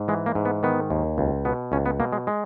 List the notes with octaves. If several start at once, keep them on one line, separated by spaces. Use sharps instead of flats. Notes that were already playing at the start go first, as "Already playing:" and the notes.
Already playing: G#2
E3 G#3
A#3
G#2
B3
D#3 B3
D#2
C#2
B2 B3
C#2 C#4
B3
B2 A#3
G#3
G#3